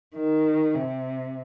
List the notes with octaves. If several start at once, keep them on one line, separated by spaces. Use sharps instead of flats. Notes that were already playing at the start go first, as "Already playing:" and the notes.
D#3
C3